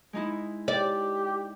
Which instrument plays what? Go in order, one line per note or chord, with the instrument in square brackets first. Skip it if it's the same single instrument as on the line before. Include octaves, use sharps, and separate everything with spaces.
[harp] G#3 D#4 E4
[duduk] G4 [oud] D5